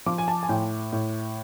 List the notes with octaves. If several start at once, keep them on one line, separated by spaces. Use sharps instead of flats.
F3 D6
G#5
A5
G#5
A2 G5
A2